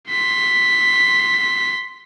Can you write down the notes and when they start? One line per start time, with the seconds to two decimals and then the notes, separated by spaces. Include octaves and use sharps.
0.10 C6 B6